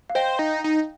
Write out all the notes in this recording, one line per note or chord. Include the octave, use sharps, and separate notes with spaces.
F5
C5 D#5 G5
D#4
D#4